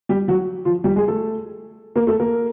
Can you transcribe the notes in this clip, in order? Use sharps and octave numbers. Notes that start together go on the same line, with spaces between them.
G3 G4
F#3 F#4
F3 F4
G3 G4
G#3 G#4
A3 A4
A#3 A#4
A3 A4
A#3 A#4